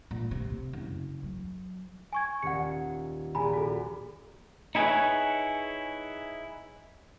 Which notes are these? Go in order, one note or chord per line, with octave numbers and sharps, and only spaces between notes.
A#2
C3
F#1
F#3
G#5 C#6 G#6
D#1 F#5 C#7
A#1 G#5 A#5 B5
F#4 A4
D#4 E4 G#4 A4 B4 C#5